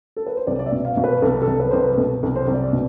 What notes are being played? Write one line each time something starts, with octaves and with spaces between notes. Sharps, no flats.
A4
B4
C5
C2 D5
D5
E5
B2
F5
B2
B4
C2 A4
A4
C2
B4
C2 C5
B4
B2 A4
C2
C5
C2
D5
B2